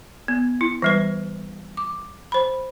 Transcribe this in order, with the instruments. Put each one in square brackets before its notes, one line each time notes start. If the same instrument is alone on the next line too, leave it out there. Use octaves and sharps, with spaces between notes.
[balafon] B3
E4
E3 G3 B4
D6
C5 B5